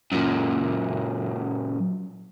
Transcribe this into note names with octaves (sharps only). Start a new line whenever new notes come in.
F#2 A#2